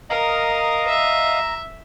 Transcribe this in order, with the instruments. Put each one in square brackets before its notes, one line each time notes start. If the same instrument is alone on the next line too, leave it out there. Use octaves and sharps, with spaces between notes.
[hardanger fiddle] A#4 [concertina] D#5 F5 D#6 [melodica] A#5
[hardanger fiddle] E5